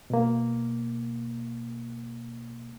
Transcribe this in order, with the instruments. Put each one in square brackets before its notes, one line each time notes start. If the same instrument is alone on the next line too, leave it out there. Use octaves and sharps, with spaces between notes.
[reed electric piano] B2 A#3